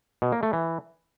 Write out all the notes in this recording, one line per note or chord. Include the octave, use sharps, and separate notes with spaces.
B2
A#3
A3
E3